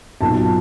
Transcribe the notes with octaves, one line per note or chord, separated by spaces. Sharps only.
B1 A#2 F#3 A5